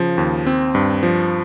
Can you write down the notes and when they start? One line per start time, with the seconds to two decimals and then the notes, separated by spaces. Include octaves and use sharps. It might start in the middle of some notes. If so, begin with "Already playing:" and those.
Already playing: C#3 F3
0.18 D#2
0.47 C4
0.75 G2
1.03 F3